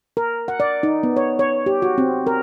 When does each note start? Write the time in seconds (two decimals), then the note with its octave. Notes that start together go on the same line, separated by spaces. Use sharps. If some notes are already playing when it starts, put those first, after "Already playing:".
0.17 A#4
0.48 F#5
0.60 D5
0.83 D#4
1.03 B3
1.17 C#5
1.39 C#5
1.66 G4
1.82 F#4
1.98 C4
2.27 A#4